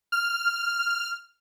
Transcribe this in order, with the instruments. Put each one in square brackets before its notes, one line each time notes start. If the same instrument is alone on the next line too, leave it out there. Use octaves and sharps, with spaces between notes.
[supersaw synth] F6